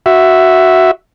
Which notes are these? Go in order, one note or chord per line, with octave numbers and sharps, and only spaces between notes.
F#4 E5